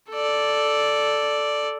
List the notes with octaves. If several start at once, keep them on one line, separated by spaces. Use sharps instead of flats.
A4 D5